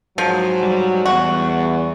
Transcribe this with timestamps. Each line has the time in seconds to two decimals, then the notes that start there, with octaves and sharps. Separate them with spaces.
0.18 G#2 F3 F#3
0.63 G3
1.06 E2 F#4